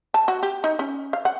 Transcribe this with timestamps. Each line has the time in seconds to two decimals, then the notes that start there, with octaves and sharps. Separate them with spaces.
0.14 A5
0.28 F#4
0.43 G4
0.64 D#4
0.79 C#4
1.13 F5
1.25 F#5